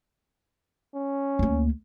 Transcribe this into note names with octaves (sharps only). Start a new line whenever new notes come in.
C#4
D2 A#3